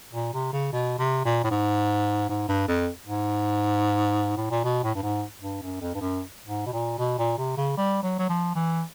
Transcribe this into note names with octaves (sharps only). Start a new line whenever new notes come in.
A#2
C3
C#3
B2
C3
A#2
A2
G#2
G#2
G2
F2
G#2
A2
A#2
B2
A2
G2
G#2
G2
F#2
F2
G2
F#2
G#2
B2
A#2
B2
A#2
C3
C#3
G3
F#3
F#3
F3
E3